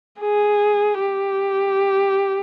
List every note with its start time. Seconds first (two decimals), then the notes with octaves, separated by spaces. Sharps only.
0.20 G#4
1.00 G4